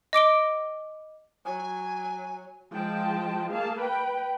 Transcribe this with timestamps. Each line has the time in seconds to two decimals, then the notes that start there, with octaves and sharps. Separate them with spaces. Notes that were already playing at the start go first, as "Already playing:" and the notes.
0.13 D#5 D6 D7 G7
1.45 F#3 G#5
2.72 F3 G#3 G5 A5
3.51 A#3 G#4 F5 A5
3.80 B4 G5 B5